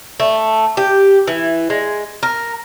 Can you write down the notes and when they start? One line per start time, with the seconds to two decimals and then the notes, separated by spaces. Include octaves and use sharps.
0.20 A3
0.77 G4
1.27 E3
1.70 G#3
2.23 A#4